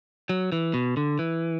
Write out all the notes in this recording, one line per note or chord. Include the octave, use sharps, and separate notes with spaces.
F#3
E3
B2
D3
E3